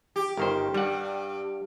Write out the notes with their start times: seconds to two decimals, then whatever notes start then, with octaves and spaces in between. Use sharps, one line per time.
0.16 G4
0.37 G1 D#3 C5
0.74 G2 G3 F#5